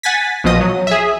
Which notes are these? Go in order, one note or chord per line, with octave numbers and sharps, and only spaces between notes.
F#5 G#5 A6 B6
A#1 B2 F3 D#5 D#6
F#3
G#4 E5